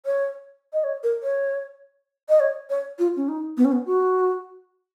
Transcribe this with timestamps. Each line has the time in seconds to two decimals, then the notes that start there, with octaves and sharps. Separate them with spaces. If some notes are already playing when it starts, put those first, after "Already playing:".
0.06 C#5
0.73 D#5
0.84 C#5
1.03 A#4
1.23 C#5
2.29 D#5
2.40 C#5
2.70 C#5
2.99 F4
3.16 C#4
3.28 D#4
3.57 B3
3.65 C#4
3.72 B3
3.86 F#4